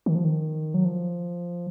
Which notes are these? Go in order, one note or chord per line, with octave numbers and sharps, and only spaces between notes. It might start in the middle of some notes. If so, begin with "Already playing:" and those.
D#3
F3
D#3
F#3
F3